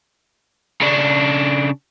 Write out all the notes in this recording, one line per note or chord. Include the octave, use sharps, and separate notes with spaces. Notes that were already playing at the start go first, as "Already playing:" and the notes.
C#3 D4